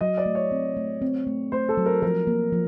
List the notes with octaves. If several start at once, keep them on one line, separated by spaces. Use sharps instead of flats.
F#3 D#5
D5
A3
C#5
C4
A3
C4
A3
A3 C5
A4
F#3
A#4
F3 A#4
A#3
F3